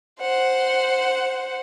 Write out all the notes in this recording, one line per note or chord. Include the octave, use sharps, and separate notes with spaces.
C5 F#5